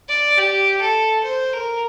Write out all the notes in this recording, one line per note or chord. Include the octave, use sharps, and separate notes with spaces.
D5
G4
A4
C5
A#4